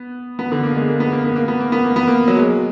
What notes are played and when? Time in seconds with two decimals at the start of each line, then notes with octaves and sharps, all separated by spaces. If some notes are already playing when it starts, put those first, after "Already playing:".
Already playing: B3
0.39 B3
0.52 D3
0.64 A#3
0.76 G#3
0.88 A#3
1.00 B3
1.12 A#3
1.24 B3
1.36 A#3
1.48 B3
1.60 A#3
1.72 B3
1.84 A#3
1.96 B3
2.08 A#3
2.28 F#3
2.37 G#3